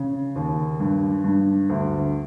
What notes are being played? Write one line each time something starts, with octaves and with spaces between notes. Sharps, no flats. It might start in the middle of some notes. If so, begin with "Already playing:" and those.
Already playing: C#3
D#2
G2
G2
D2